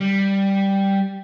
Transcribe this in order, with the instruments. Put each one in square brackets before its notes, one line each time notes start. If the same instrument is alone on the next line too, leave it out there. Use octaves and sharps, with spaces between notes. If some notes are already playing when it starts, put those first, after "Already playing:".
[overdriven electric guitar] G3